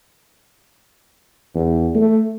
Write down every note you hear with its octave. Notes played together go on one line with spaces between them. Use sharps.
E2
A3